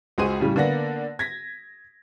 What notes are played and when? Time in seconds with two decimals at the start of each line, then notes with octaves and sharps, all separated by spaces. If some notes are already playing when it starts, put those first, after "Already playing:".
0.18 C#2 G#3 F#4 G#4 C5 D#7
0.40 A2 C#3 G3
0.56 D3 A#3 B3 D5 F#5 A#6
1.19 G#6 A#6 B6